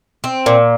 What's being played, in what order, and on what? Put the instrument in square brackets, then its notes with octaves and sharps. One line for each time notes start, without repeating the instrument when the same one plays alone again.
[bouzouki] C4
A#2